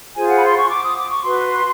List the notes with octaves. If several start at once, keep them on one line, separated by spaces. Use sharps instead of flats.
F4 G#4 C5 G#5
F#5
B5
C6
C#6
D6
D#6
D6
C#6
F#4 B4 C6